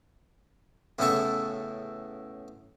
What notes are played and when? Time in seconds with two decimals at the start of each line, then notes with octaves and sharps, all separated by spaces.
0.99 E2 A2 C#3 A4 C#6